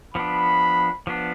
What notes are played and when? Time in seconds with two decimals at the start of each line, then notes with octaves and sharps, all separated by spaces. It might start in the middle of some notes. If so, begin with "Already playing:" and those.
0.14 F3 B3 D4 B5
1.07 F3 B3 D4